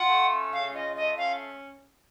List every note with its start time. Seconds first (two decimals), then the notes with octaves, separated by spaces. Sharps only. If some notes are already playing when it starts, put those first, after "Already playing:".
Already playing: F4 F#5
0.10 A3
0.30 C#4
0.52 C#3 F5
0.74 F4 D#5
0.96 A3 D#5
1.17 C#4 F5